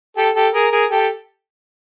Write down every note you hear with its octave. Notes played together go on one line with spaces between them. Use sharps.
G4 A4
G4 A4
G#4 A#4
G#4 A#4
G4 A4